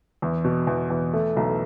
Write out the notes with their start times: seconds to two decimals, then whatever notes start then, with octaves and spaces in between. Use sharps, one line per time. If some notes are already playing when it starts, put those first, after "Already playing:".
0.22 E2
0.44 B2
0.67 E2
0.90 E2
1.13 A3
1.36 B1